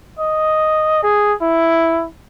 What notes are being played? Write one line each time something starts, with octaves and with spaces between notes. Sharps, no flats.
D#5
G#4
E4